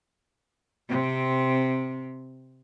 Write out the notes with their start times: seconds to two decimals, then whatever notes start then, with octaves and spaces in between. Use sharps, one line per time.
0.89 C3 C4